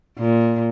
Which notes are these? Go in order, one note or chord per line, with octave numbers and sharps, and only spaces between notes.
A#2